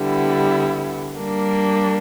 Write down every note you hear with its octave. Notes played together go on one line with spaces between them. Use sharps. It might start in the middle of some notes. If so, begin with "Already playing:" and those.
Already playing: D3 G3 B3 E4
G3 A#3 D4